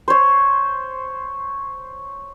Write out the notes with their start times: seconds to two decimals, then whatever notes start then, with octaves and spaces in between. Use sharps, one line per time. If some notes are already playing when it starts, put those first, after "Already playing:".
0.08 C5 C#5